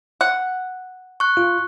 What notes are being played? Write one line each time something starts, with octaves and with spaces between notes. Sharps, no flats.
F#5
C#6 F#6
F4